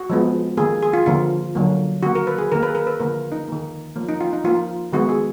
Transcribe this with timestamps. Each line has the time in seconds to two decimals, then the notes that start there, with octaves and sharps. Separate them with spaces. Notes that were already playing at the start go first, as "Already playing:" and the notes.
Already playing: F#4
0.10 F3 G#3 B3
0.57 D#3 A#3 G#4
0.83 G#4
0.93 F4
1.06 D3 F3 A#3 F4
1.55 D3 F#3 A#3
2.03 D#3 A#3 F#4
2.15 A#4
2.27 B4
2.39 G#4
2.52 D#3 A#3 A#4
2.63 B4
2.70 G#4
2.75 A#4
2.87 B4
3.00 D3 F3 A#3 A#4
3.32 D#4
3.48 D#3 A#3
3.96 F3 A#3
4.09 D#4
4.20 F4
4.33 D#4
4.44 F3 A#3 F4
4.93 D#3 G#3 B3 F#4
5.09 G#4